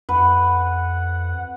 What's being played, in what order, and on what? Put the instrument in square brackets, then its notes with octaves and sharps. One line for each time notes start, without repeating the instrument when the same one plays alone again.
[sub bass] F2 [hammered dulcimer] B4 [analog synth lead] F#5